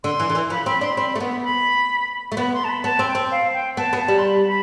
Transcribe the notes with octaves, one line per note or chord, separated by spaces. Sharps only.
D3 C6
E3
D3
E3
F3 B5
C4 B5
D4 C6
C4 B5
A3
B3
B5
A3
B3 B5
C6
A5
B5
B3 A5
C4
G5
C4
F5
G5
B3 A5
B3
A5
G3
C6
B5
B5